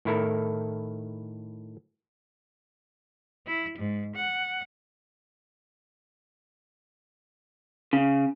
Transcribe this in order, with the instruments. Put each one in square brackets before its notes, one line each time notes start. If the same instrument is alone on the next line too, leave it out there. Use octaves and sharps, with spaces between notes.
[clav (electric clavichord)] A2 D#3 E4 A4 A#4
[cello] E4
G#2
F#5
[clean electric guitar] C#3